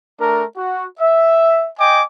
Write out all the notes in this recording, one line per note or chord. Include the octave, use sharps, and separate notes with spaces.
A3 D4 A#4
F#4
E5
D#5 G5 G#5 D6